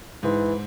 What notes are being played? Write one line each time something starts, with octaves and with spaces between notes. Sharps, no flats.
G#2 E3